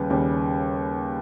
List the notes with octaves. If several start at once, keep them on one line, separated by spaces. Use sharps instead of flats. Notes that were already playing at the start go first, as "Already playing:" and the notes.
Already playing: D#2 C#3 G3 B4
D#2 C#3 G3